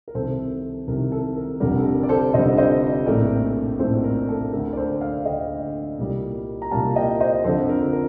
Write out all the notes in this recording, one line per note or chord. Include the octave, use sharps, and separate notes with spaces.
A#4
C2 C3 D#3 A4 C5
C2 C3 D#3 A#4
A4
A#4
F1 F2 D3 G3 A#4
A4
A#4
D5
A4 C5
F1 F2 D3 G3 C5 D#5
C5 D#5
A#1 A2 A3 C4 A#4 D5
A#1 A2 A3 C4 A4 C5
A#4
A4
D2 D3 A3 A#4
D5
A4 C5
D5 F5
D2 D3 A3 D#5 G5
C2 A#2 G3 A#3
A#5
C2 A#2 G3 A#3 F5 A5
D#5 G5
C5 D#5
F2 D3 F3 A4 C5
A#4
A#4